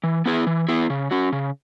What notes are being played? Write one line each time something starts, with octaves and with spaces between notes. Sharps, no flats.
E3
B3 E4 G#4
E3
B3 E4 G#4
C#3
F#3 C#4 F#4
C#3